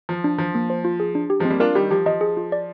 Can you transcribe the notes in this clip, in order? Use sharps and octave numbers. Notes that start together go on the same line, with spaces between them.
F3 F4
D4
F3 F4
A#3
C5
F4
G#4
D4
G4
F3 G#3
C4
G3 A#3
D4 F4 A#4
D#3 G3 G4
F3 G4
F3 D#5
G#4
F4
D5